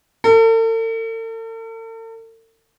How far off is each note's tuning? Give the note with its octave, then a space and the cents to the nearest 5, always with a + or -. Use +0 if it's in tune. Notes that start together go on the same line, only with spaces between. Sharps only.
A4 +45